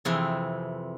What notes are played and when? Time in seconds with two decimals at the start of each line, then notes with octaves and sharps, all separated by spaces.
0.05 F2 C3 E3 G#4